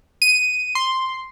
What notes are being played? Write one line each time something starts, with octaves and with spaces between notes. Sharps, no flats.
D#7
C6